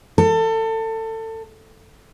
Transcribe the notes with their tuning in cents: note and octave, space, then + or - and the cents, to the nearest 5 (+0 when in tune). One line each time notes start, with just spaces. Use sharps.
A4 +25